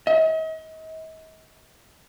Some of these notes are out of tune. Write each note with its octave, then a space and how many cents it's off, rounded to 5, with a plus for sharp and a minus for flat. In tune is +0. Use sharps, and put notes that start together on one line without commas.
D#5 +45